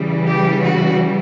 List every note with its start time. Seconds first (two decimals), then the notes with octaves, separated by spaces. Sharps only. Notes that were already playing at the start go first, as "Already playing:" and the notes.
Already playing: C#3 E3 G3
0.27 G4
0.61 F#4